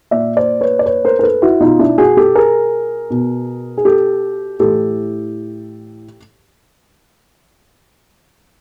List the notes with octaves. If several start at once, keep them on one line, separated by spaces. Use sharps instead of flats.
A#2 D5 E5
C5 D5
B4 C#5
D5
B4 C#5
A#4 C5
A#4
A4 B4
E4 F#4
B2 D#4 F4
D4 E4
F#4 G#4
G4 A4
G#4 A#4
B2
G#4
G4 A4
A2 E3 G4 A4